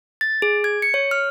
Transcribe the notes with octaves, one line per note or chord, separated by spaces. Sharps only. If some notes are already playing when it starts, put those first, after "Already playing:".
A6
G#4
G#6
C#7
C#5
F6